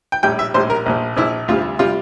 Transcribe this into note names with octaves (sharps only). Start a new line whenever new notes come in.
G5
A#1 A2 G3 G5
E5
A#1 A2 G3 C5
A#4
A#1 A#2 F3
A#1 A#2 F3 E4
D2 C3 G3 F4
C3 G3 F4